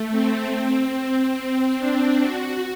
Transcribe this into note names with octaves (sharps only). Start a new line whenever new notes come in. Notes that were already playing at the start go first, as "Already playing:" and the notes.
Already playing: A3
C4
C4
D4
F#4